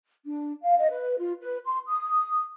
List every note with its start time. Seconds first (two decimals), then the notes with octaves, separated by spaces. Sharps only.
0.25 D4
0.62 F5
0.78 D#5
0.90 B4
1.18 F4
1.42 B4
1.66 C6
1.87 D#6